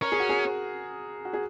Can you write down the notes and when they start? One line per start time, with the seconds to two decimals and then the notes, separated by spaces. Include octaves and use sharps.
0.02 C#4 A#4
0.12 G#4
0.20 F#4
0.29 G#4
1.25 F#4
1.33 G#4